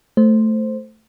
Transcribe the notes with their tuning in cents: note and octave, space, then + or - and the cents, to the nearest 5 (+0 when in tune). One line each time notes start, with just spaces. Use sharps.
A3 +0 C5 +0